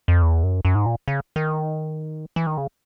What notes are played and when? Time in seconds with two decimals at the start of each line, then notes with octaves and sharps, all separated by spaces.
0.08 F2
0.22 E2
0.43 F#2
0.65 F#2
0.75 G#2
0.86 A#2
1.08 C#3
1.36 D#3
2.36 E3
2.47 D#3
2.58 C#3